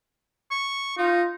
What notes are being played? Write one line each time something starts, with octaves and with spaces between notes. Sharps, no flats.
C#6
D#4 F4